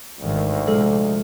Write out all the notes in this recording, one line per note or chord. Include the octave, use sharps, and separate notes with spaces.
G#1 D2 G#2 D#3
A#1 C3 F3 G#3 F4 A4